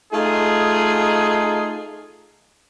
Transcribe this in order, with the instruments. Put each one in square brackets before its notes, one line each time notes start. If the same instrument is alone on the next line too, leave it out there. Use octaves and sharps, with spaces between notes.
[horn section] A3 D#4 F4 G#4